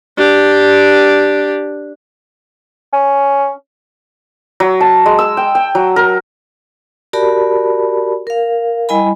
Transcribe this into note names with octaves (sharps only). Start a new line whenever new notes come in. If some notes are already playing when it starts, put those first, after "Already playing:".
D4 G4
C#4
F#3
A5
G#3
E6
G5
G5
F#3
A#4
F#4 G4 A#4 D5 A5 B5
A#4 F5
G3 E4 D#5 G#5 B5